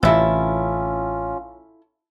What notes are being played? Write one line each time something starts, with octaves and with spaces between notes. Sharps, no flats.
A1 C3 C#4 E4 F4 A4